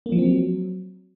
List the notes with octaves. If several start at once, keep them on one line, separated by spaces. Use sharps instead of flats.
A#3
F3
C4
F#3